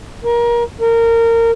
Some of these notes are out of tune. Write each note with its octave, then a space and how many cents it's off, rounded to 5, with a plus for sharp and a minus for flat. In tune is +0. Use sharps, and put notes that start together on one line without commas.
A#4 +25
A#4 -20